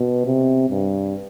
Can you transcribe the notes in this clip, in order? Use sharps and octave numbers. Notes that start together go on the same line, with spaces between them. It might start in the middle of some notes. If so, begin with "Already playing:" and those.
Already playing: B2
C3
G2